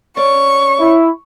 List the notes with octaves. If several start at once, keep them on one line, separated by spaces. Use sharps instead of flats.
C#4 D5 C#6
E4